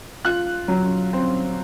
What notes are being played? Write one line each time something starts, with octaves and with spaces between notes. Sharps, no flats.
F4 F#6
F#3
C4